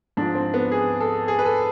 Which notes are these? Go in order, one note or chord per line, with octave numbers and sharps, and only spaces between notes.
G#2 F3 D4
C4
B3
G#4
A4
G#4
B4
A4